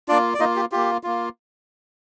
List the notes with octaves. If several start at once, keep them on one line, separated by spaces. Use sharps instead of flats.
A#3 D4 F4 D5
D5
A#3 D#4 F4 D#5
G4
A#3 F4 G4
A#3 F4